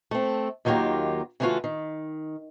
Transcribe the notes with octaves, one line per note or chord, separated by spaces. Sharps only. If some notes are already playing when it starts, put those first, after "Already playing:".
A3 C4
D#2 D#3 F#3 A#3 F4 G4
C#3 E3 A3 D4 F4 F#4
D#3